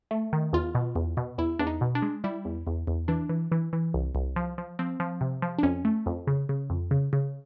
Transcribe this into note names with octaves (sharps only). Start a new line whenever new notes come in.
A3
D#3
E2 F4
B2
E2
B2
E2 E4
E2 D4
D#4
B2
D4
G#3
G3 E4
E2
E2
E2
E3 D4
E3
E3
E3
C2
C2
F3
F3
F3 C4
F3
C3
F3
D4
F2 C#4
A3
F2
C#3
C#3
F2
C#3
C#3